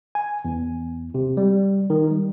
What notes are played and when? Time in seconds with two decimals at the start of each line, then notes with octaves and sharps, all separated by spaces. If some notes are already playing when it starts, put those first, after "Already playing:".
0.15 G#5
0.45 E2
1.14 C3
1.37 G3
1.90 D#3
2.11 G3